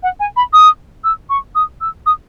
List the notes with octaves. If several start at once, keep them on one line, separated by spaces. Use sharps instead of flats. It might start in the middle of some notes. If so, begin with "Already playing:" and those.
F#5
G#5
B5
D#6
E6
C#6
D#6
E6
D#6